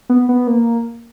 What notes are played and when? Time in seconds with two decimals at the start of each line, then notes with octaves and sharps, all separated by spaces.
0.09 B3
0.29 B3
0.47 A#3